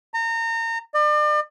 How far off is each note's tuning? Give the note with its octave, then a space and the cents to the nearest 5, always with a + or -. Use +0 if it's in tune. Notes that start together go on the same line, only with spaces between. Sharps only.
A#5 -30
D5 +40